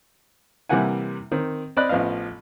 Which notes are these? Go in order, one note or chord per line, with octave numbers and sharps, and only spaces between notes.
C3 E3 G3 A#3 F#5 G#5
D#3 C4
C4 D5 D#5 B5 F#6
A1 F3 B3 D#5 F5